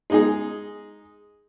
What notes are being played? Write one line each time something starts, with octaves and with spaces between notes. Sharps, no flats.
G#3 D#4 G#4